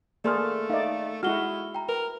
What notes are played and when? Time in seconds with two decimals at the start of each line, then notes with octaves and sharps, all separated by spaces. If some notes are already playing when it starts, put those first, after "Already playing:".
0.25 A3 A#3 G#4 A4 D5 C6 F6
0.70 D#4 D5 E5 F5
1.23 G#3 E4 F#4 F6 G7
1.75 G5 A#5
1.88 A#4 B4